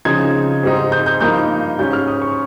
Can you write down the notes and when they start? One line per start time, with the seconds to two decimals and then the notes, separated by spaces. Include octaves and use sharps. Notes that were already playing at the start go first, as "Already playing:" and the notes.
0.05 C#3 F3 C4 D#4 G#6
0.63 G#2 G3 C4 D#4
0.92 G6
1.06 G6
1.21 G2 F3 A#3 D#4 G6
1.79 G#2 G3 C#4 G6
1.93 F6
2.08 D#6
2.22 C#6